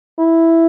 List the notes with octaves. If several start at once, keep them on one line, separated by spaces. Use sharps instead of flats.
E4